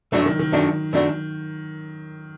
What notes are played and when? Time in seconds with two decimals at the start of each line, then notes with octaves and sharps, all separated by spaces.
0.12 F#2 D3 F#3 A3 D4 F#4
0.26 D#3
0.39 D#3
0.52 F#2 D3 A3 D4 F#4
0.93 F#2 D3 A3 D4 F#4